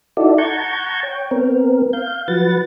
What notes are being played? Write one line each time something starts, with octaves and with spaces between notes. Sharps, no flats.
D#4 E4 F#4 A4 D5
F#5 A5 A#5 C#6 G6 G#6
C#5 G5
B3 C4 A#4
F5 G6
F3 F#3 B4 F#5 A6